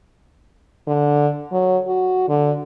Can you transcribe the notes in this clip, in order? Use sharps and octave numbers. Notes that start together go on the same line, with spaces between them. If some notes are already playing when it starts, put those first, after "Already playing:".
D3
F#3
F#4
D3